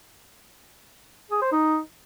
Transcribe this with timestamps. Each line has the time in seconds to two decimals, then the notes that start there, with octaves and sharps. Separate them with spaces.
1.31 G#4
1.42 C5
1.52 D#4